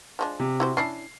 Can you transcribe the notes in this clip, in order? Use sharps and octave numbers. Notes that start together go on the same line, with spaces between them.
F3 G#3 D4
C3
E4 F#4 C5
C#4 D4 E4 C7